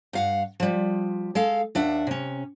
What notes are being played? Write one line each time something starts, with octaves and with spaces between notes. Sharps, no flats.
G2 F5 F#5
F3 G3
G#3 A4 F5
D#2 D4 E5 F#5
C3 C#4